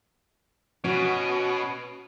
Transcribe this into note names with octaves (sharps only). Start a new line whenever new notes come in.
B2 C#4 F#4